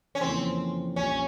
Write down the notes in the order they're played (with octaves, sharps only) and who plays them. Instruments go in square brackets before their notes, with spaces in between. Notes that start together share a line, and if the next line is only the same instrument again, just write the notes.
[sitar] C#4
[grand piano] F2 C#3 E3 A#3 [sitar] C4
[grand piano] A#1 A#2 G3 [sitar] C#4